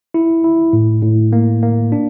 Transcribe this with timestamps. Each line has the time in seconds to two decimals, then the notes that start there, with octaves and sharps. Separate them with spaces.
0.14 E4
0.44 E4
0.73 A2
1.03 A2
1.33 A#3
1.63 A#3
1.92 D4